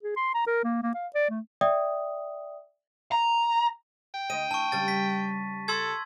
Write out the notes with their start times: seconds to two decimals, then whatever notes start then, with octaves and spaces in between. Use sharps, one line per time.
0.03 G#4
0.17 C6
0.34 A#5
0.47 A#4
0.64 A#3
0.83 A#3
0.94 F5
1.15 D5
1.30 A3
1.61 D5 E5 G5 D#6
3.12 A#5
4.14 G5
4.30 D2 D#5 D#7
4.51 E3 A5 C#6
4.72 C#3 G3 A6
4.88 B6
5.68 A4 C6 E6 G#6